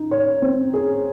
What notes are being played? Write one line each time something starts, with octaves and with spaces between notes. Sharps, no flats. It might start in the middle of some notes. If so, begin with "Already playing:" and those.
Already playing: D#4
C#5
C4
G#4